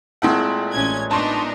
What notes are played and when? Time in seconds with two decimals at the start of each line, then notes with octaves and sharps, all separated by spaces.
0.22 A#2 G#3 A3 C4 E4 F#5
0.73 A1 C#4 G#6
1.11 B3 D4 D#4 A5 C6 C#6